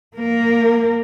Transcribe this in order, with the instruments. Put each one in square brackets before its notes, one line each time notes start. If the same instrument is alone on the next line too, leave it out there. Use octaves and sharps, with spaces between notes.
[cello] A#3 A#4